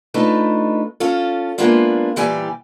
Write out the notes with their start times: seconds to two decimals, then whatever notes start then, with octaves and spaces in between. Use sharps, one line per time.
0.14 A3 D4 D#4 F4 B4
1.00 C#4 F4 A4
1.58 G#3 A#3 B3 D4 F4 E5
2.16 A#2 E3 G3 G4 D5 G#5